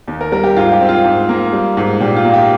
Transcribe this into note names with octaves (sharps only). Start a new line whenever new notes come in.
D#2
A#4
G3 A#4
G4
G#2 F4
G4
C4
F4
G#2
A#3
G3
G#2
A#2 G4
F4
A#3
G4